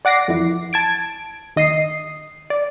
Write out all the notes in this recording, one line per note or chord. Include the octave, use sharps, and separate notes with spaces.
D5 F#5 D6 A#6 C7
F2 E3
A5 G#6 D7
D#2 D#5 D#6 C7
D5